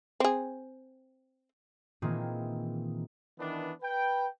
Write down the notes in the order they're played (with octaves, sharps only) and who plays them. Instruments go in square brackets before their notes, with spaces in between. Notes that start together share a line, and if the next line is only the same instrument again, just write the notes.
[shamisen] C4 G#4
[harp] A#2 D#3 E3 A#3 C4 G#4
[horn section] D#3 E3 B3 D4
B4 G5